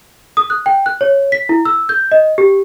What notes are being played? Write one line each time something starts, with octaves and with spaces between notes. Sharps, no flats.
D#6
F#6
G5
F#6
C#5
B6
E4
E6
G6
D#5
G4